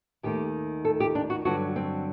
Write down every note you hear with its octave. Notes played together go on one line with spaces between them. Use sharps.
D#2 D#3 A3 G4
A4
G4
D4
F#4
G2 D3 F#3 F#4
C4